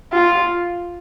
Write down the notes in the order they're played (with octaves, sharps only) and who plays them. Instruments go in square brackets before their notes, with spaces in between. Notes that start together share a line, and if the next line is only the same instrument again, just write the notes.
[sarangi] F4